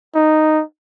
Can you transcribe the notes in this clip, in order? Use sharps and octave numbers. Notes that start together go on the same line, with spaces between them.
D#4